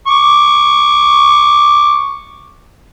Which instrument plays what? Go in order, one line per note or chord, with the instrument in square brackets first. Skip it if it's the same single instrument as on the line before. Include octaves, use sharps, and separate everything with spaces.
[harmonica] C#6 D6